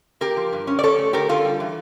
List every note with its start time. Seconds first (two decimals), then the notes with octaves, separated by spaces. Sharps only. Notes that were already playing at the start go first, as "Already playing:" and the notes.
0.21 A#3 G4 A#4
0.37 F3
0.53 G2
0.67 C#4
0.79 D5
0.84 C#4 A4 C#5
0.98 A3
1.13 D3 G4 A#4
1.29 D3 F4 A4
1.45 G3
1.60 E3